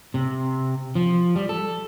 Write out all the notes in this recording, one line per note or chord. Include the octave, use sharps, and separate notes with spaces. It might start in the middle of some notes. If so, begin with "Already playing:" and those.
C3
F3
G3
A4